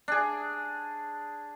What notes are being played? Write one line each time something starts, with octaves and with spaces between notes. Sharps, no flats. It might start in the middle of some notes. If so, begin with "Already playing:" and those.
D4 G#4